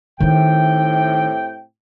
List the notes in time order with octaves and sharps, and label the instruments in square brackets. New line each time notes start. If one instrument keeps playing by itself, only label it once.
[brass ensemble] A2 C3 G5 [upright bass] D#3 D#4